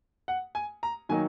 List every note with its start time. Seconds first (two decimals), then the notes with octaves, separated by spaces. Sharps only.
0.28 F#5
0.55 G#5
0.83 A#5
1.09 D#3 F#3 A#3 D#4 G#5